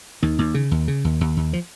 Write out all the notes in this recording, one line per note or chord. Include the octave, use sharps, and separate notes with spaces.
D#2 D#3
D#2
C#3
D#2
C#3
D#2
D#2
D#2
F3